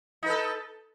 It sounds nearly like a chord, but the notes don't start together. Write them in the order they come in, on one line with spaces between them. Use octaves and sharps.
D#4 B4 A4